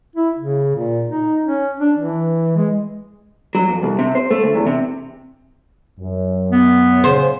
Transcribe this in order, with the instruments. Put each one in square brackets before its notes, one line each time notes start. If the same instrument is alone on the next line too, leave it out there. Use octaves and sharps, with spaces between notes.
[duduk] E4
C#3
A#2
D#4
C#4
D4
E3
G#3
[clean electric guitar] F#3
F2
C2
C3
C5
A3
D2
E2
C3
[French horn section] F#2
[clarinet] B3
[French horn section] C#3 [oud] C5